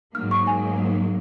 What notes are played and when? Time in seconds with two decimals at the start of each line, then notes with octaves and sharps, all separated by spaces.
0.15 G#2 F#3 A#3 F6
0.31 C#6
0.47 G#5